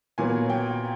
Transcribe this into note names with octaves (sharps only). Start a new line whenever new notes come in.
A#2 F#3 B3 G#5
G5